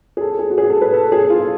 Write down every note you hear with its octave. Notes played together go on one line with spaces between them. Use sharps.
G#4
A4
G#4
F#4
G#4
A4
B4
A4
G#4
F4